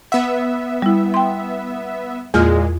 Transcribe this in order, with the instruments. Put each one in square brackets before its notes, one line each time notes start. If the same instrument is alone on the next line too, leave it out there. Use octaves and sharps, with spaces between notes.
[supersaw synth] B3 E5 [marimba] F#5
[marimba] G3 E4
G5 C6
[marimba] E2 F4 F6 [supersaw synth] A#2 G#3